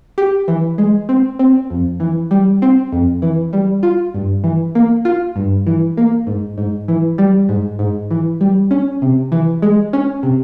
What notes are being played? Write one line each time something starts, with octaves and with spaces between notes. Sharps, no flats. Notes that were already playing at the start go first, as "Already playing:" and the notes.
G4
E3
G#3
C4
C4
F2
E3
G3
C4
F2
E3
G3
F4
G2
E3
A#3
F4
G2
E3
A#3
G#2
G#2
E3
G3
G#2
G#2
E3
G3
C#4
C3
E3
G#3
C#4
C3